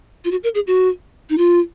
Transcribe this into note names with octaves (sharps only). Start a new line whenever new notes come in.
F4
F#4
A#4
G#4
F#4
D#4
F4